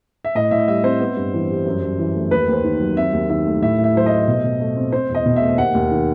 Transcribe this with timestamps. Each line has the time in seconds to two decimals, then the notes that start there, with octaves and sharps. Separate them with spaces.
0.25 E5
0.35 A2 D#5
0.51 A2 E5
0.68 G3 E5
0.84 C4 C5
1.00 B3
1.17 G2
1.34 E3
1.50 G3
1.66 F#2
1.83 F#2
1.99 E3
2.15 A3
2.31 D#2 B4
2.48 D#2
2.53 C5
2.64 D#3
2.80 F#3
2.97 C4 E5
3.13 D#2
3.29 D#3 E5
3.46 A3
3.62 A2 E5
3.78 A2
3.84 E5
3.95 F#3 C5
4.06 A3 D#5
4.28 B2
4.44 B2
4.60 A3
4.77 C4
4.92 C4 C5
5.10 E2
5.15 D#5
5.25 B2
5.36 E5
5.42 A3
5.58 D#2 F#5
5.75 D#2
5.91 D#3